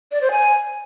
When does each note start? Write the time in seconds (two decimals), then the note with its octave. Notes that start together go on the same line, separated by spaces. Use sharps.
0.11 D5
0.21 C5
0.31 G#5